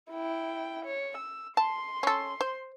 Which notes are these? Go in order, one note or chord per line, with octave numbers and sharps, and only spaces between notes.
E4 G5
C#5
E6
A5 C6
C#4 A4
C5